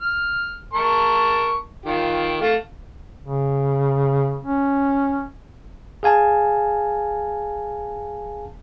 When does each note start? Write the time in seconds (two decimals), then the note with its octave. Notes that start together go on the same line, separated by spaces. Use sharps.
0.01 F6
0.73 A#4 A5 C#6
1.85 D#3 F4 G4
2.41 A3 F5
3.22 C#3
4.45 C#4
6.03 G#4 F5 G#5 A5